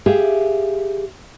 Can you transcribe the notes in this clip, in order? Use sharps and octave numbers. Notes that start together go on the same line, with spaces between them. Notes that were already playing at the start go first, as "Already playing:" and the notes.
G4 G#4 E5 F5